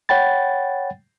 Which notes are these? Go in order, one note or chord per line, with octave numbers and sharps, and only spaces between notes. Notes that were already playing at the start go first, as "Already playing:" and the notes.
C#5 F#5 G5 B5 A6